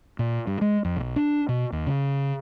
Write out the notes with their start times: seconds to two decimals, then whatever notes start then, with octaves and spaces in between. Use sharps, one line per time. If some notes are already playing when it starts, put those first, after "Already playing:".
0.19 A#2
0.47 G2
0.61 G#3
0.85 F2
0.96 B1
1.16 D4
1.49 B2
1.72 D#2
1.87 C#3